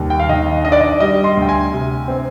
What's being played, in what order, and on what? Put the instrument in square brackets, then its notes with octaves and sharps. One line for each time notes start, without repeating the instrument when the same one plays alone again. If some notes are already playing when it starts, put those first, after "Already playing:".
Already playing: [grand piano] D#2 G3
G5
F5
D#3 D#5
D4 D#5
D5
D#5
G3 D#5
C6
D2 G5
G#5
C3
C4